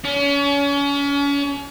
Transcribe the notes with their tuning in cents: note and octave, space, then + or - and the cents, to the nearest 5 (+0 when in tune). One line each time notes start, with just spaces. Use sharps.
C#4 +35